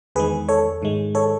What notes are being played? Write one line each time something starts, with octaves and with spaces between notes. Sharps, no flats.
E2 D#3 G#3 G#4 B4
A4 C#5
G#2 D#3 G#3
A4 C#5